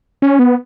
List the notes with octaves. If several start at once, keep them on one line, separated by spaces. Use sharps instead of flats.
C#4
B3